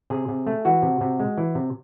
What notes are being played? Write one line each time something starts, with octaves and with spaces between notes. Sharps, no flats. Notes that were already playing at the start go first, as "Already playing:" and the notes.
C3 G#4
C3
A3
E3 F#4
C3
C3
G#3
E3
C3